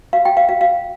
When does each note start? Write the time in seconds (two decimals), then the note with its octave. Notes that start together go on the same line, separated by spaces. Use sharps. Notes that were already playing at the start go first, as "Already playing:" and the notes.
0.13 F5
0.25 G5
0.37 F5
0.49 F5
0.61 F5